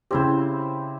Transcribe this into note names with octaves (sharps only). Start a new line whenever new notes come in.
C#3 C4 E4 G4 C5